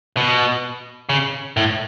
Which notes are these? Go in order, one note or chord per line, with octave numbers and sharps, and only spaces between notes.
B2
C#3
A2